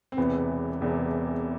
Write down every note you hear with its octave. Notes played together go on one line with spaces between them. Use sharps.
C4
E1 E2 C3 E3 B3
E1 E2 C3 E3